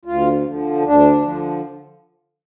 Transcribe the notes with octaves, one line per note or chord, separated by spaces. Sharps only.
D2 F4
D3 F3
D2 D4
D3 F3